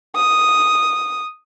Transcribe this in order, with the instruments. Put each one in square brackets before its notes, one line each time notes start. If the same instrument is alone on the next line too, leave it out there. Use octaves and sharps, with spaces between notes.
[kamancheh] D#6